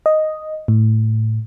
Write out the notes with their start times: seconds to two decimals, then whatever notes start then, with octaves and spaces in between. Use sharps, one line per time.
0.06 D#5
0.68 A2